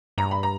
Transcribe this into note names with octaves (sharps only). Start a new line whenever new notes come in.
G2 A#5
B5
A#5